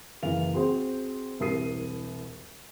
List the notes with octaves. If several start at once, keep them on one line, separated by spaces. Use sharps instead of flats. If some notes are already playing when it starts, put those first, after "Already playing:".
F#1 E3 F5 F7
C4 F#4 G#4 C5
E1 C2 A#4 D#6 C7 D#7